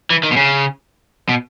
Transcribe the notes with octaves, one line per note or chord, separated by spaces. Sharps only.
E3
D#3
B2
C#3
B2